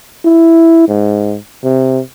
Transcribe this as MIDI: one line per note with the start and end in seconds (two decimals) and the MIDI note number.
0.25 0.87 64
0.89 1.36 44
1.64 2.00 48